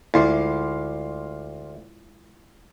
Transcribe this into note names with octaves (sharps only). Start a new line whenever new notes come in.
D2 G#3 E4 F4 F5 C6 D6